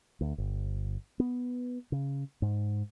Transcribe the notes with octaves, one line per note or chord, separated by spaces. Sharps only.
D2
G1
B3
C#3
G#2